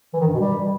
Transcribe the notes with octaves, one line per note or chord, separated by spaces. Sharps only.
E3
D#3
G2
B2
G3